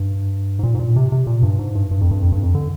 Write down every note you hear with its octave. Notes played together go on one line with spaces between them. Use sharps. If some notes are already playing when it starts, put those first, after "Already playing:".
Already playing: G2
G#2
A#2
G#2
A#2
C3
C3
A#2
G2
G#2
G2
G2
F2
G2
F2
G2
F2
D3